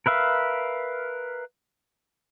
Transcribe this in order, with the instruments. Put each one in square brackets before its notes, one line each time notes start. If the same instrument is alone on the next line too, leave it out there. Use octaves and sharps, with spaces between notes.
[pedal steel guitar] A#4 B4 E5 F5